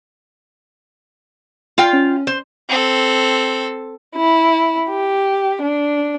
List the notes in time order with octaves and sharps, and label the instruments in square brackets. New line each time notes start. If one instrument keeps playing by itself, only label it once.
[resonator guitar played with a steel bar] F4 F5 G5
[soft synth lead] C#4
[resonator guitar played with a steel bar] C5
[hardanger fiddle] C4 A4
[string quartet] E4
G4
D4